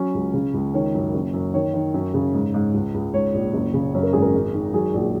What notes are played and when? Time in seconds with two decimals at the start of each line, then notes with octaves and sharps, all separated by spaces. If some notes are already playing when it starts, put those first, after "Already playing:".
Already playing: F#3 C#4
0.14 C#2
0.34 C#3
0.54 C#2
0.74 D#3 C#5
0.94 F#2
1.14 F#1
1.33 F#2
1.54 D#3 C#5
1.74 D#3
1.94 F#2
2.14 C#3
2.34 G#2
2.54 G#2
2.74 C#2
2.94 C#2
3.13 G#2 C#5
3.34 A#1
3.54 F#1
3.74 C#3
3.94 F#2 C#5
4.03 A#4
4.13 G#1 G#4
4.22 A#4
4.34 G#3
4.54 D#3
4.73 F#3 G#4
4.94 A#1